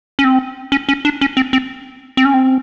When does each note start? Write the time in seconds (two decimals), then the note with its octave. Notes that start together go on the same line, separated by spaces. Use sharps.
0.19 C#4
0.24 C4
0.72 C#4
0.89 C#4
1.05 D4
1.21 C#4
1.37 C4
1.53 C4
2.17 C4
2.25 C#4
2.34 C4